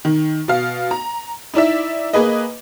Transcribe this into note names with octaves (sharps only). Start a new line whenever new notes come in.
D#3
B2 F5
A#5
D#4 E4 D5 E5
A#3 G#4 B4 D#5